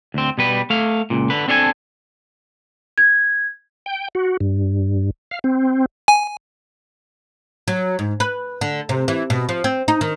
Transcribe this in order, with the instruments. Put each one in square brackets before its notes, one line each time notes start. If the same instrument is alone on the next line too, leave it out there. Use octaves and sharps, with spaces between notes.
[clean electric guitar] D2 C4
B2 G3 B4
A3 F5
C#2 A#2
D3 B4
C4 D4 A4 C#5 G#5
[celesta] G#6
[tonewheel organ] G5
F#4
G2
F5
C4
[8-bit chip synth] G#5
[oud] F#3
G#2
B4
D3
C3
E3
B2
F3
C4
D#4
D#3